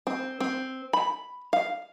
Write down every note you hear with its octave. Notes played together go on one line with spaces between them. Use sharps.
C4
C4
B5
F5